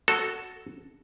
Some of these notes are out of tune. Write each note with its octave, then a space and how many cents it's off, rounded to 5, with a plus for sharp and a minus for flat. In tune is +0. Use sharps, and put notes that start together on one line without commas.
F#4 +0 A4 +0